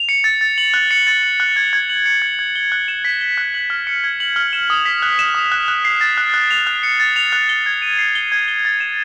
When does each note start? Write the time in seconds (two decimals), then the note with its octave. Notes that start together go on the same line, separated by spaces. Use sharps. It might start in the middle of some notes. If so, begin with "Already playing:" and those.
Already playing: F7
0.09 C#7
0.24 A6
0.41 A6
0.58 F#7
0.74 F#6
0.91 C#7
1.07 A6
1.23 F#7
1.40 F#6
1.56 G#6
1.73 G#6
1.90 F#7
2.06 C#7
2.22 G#6
2.39 G#6
2.55 G7
2.72 F#6
2.88 E7
3.05 B6
3.21 G7
3.38 F#6
3.54 F#7
3.70 F6
3.87 C#7
4.04 G#6
4.20 F#7
4.36 F6
4.53 E7
4.70 D#6
4.86 B6
5.02 F#6
5.19 E7
5.35 D#6
5.52 F#6
5.68 F#6
5.85 C7
6.01 A6
6.17 F#6
6.34 F#6
6.50 F7
6.67 F#6
6.83 C#7
7.00 A6
7.16 F7
7.32 F#6
7.49 G7
7.66 G#6
7.82 D#7
7.99 C7
8.15 G7
8.32 G#6
8.48 G7
8.65 A6
8.80 E7